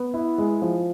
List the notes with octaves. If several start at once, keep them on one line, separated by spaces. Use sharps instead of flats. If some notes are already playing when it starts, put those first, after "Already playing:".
Already playing: B3
E4
G#3
F3